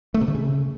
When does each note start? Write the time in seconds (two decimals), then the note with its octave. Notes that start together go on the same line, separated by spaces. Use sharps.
0.14 A3
0.21 C3
0.28 D3
0.35 C#3